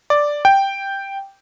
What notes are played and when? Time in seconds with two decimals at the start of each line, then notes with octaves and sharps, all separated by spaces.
0.10 D5
0.45 G5